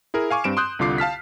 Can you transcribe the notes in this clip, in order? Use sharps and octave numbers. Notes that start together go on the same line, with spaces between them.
E4 G#4 A#4
F5 G#5 C#6 D6
G2 C4 D7 E7
C6 D#6 F#6 G6
C2 D3 F4 D6 C7
F5 A5 F6 B6